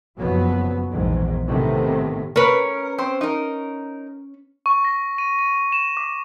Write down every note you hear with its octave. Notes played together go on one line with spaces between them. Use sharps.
F#1 F2 B2 F3 F#3 B3
A#1 E2 G#2 D#3
A2 C3 D#3 A3 B3
C#4 A#4 B4
C4 C5
D#4 A#4
C#6
A#6
D#7
D#7
E7
D6